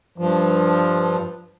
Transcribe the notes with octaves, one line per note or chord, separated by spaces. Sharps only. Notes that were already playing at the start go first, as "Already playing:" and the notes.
G2 F3